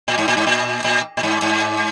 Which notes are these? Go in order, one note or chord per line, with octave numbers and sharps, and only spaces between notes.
A#2
G#2
A#2
G#2
A#2
A#2
A#2
G#2
G#2